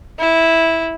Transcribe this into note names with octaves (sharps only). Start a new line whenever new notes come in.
E4